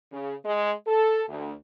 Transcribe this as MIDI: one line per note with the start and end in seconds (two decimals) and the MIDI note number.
0.12 0.35 49
0.45 0.71 56
0.88 1.24 69
1.29 1.52 38